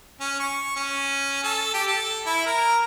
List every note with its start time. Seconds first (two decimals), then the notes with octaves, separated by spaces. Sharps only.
0.20 C#4
0.40 C#6
0.76 C#4
1.43 A4
1.74 G4
1.87 A4
2.26 E4
2.46 A#4